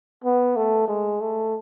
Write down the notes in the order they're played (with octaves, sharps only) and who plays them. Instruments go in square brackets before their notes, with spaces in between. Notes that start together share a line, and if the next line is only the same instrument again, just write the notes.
[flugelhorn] B3
A3
G#3
A3